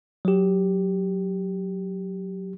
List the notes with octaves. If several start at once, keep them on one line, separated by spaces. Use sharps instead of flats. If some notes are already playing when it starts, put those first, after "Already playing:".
F#3 G4